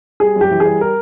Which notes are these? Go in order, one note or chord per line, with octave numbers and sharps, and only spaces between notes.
G3 G#4
F#2
G4
E3
G#4
G3
A#4